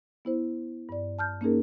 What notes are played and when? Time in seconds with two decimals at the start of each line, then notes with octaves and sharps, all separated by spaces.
0.25 B3 E4 C5
0.89 G2 D5
1.19 A5 F6 G6
1.41 A#3 C#4 D#4 G#4 A#4